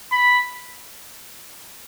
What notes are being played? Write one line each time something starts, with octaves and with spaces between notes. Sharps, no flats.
B5